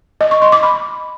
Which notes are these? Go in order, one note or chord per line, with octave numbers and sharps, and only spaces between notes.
D#5
C#6
C6
D6
B5